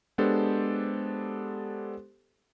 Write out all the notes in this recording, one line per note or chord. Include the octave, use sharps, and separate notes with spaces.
G#3 B3 D4 G4 A4 C5